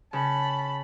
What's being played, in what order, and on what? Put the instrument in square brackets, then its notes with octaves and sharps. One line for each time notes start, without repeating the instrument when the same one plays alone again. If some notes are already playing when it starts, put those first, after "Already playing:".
[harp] C#3 [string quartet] A5 B5